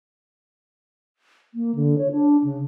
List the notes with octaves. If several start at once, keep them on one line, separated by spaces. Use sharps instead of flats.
A#3
D3
C#5
D4
C#3